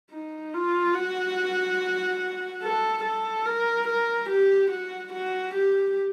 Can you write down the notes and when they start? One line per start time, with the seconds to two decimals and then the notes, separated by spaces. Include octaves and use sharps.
0.11 D#4
0.54 F4
0.95 F#4
2.62 A4
3.04 A4
3.46 A#4
3.88 A#4
4.30 G4
4.71 F#4
5.13 F#4
5.55 G4